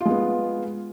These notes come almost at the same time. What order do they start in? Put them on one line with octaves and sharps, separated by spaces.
F4 G#3 B3